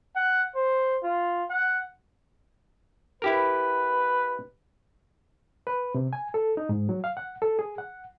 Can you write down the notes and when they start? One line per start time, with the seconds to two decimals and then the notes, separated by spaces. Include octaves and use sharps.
0.16 F#5
0.55 C5
1.03 F4
1.50 F#5
3.22 E4 G4 A#4 B4
5.67 B4
5.95 C3
6.13 G#5
6.34 A4
6.57 D#4
6.69 G#2
6.89 F#3
7.04 F5
7.17 F#5
7.42 A4
7.59 G#4
7.78 F#5